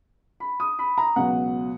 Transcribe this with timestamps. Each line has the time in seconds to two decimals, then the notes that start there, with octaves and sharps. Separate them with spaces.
0.40 B5
0.60 D#6
0.79 B5
0.98 A#5
1.16 C#2 B2 F#3 F#5